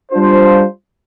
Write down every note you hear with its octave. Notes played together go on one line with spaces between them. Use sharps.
G3 D4 F4 C5